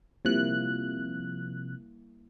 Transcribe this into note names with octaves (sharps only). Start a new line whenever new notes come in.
C3 F3 G3 A#3 E4 F#6